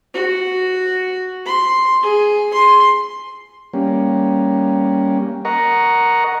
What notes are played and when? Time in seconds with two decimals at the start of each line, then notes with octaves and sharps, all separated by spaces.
0.14 F#4
1.45 C6
2.02 G#4
2.54 C6
3.73 G3 A#3 C#4
5.45 A#4 D#5 F#5 A#5 C#6